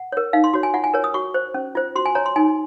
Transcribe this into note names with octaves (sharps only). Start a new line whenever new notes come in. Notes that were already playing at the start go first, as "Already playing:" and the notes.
Already playing: F#5
A#4 C#5
D#4 F5
C6
F#4 C#5
G#5
F4 F#5
G#5
A#4 C#5
D#6
F#4 C#6
C5
C#4
F4 C5
F#4 C6
G#5
C#5 A#5
C6
D#4 G#5